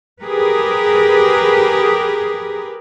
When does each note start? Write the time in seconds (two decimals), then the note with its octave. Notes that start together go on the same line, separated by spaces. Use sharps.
0.21 G4 G#4 A#4 B4